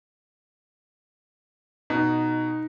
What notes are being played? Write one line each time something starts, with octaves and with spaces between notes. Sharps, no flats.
B2 D#4